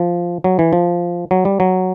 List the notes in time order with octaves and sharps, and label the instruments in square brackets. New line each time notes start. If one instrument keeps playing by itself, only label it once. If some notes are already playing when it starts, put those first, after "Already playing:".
Already playing: [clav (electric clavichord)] F3
F#3
E3
F3
F#3
G3
F#3